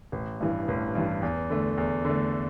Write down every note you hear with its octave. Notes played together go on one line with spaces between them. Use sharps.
A1
G2 E3
A1
G2 E3
E2
D3 A3
E2
D3 A3